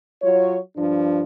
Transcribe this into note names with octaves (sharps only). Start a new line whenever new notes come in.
F#3 F4 C#5
G2 F3 D4